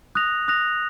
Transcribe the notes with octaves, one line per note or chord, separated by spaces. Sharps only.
D#6 F#6 A#6 F7
D#6 F#6 A#6 F7